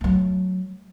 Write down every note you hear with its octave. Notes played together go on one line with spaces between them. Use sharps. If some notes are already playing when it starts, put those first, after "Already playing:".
F#3 A3